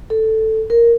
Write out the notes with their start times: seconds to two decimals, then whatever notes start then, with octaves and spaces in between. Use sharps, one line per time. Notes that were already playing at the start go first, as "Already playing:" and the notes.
0.10 A4
0.70 A#4